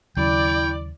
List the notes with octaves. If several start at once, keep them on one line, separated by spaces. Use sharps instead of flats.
D#2 C#3 F#3 E4 D5 G5 B5